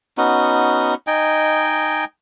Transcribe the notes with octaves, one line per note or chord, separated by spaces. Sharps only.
B3 C#4 D#4 F#4
D#4 D#5 G5 G#5